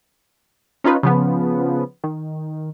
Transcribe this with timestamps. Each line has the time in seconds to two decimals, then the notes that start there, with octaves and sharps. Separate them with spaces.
0.84 C#4 D#4 F4 B4
1.03 C#3 F3 B3
2.04 D#3